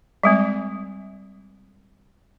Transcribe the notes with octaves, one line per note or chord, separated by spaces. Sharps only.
G3 G#3 C4